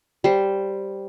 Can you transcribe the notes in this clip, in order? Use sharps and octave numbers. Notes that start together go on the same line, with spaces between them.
G3 C5